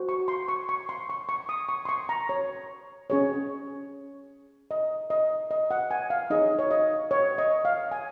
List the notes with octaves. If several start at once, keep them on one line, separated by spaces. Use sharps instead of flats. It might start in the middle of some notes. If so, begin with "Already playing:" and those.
Already playing: F#4 C5
C#6
C6
C#6
C#6
C6
C#6
C#6
D#6
C#6
C6
C#6
A#5
C#5
C#4 G#4 C#5
D#5
D#5
D#5
F#5
G#5
F5
D#4 G#4 C#5 D#5
C#5
D#5
C#5
D#5
F5
G#5